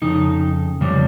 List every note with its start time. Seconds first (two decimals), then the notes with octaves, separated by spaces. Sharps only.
0.02 F2 C#3 D#4
0.81 F2 C#3 G3